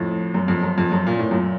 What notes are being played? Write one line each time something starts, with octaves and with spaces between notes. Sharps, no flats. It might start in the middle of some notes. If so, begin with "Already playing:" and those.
Already playing: F2 A2
F#2
F2
F#2
F2
F#2
A#2
A2
F#2 A#2